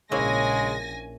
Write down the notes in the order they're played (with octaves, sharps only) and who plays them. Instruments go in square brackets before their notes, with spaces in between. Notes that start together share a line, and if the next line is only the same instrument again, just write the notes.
[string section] A#1 G#5 A#6 [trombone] C#3 [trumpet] G#3 [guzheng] A#3 C#4 E4